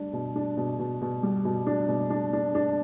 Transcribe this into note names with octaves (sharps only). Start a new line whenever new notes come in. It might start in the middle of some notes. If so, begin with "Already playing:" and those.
Already playing: G3 D4
B2
D4
B2
B2
B2
G3
B2
D4
B2
D4
D4
D4